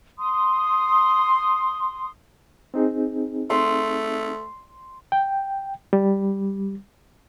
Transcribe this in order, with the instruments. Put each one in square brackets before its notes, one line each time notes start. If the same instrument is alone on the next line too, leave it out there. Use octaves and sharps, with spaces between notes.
[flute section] C6 D#6
[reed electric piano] C4 D#4 G#4
[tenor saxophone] A3 [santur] C6
[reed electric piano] G5
G3